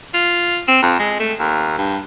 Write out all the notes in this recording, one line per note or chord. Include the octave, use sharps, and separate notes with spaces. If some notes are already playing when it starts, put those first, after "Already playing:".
F4
C4
F2
G#3
A3
D#2
G2